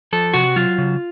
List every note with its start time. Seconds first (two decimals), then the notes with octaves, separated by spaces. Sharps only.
0.13 F3 A4
0.34 C3 F#4
0.56 F#3 F4
0.78 C#3